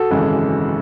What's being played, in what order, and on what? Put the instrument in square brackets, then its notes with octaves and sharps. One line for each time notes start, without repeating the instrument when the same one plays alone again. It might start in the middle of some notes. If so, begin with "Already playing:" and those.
Already playing: [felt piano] F#4 A4
G#1 F#2 C#3 E3 G#3